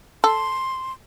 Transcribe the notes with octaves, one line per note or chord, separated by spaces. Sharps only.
A4 C6